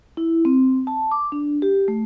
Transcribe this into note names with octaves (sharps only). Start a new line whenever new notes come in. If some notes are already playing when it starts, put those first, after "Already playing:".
E4
C4
A5
D6
D4
G4
A3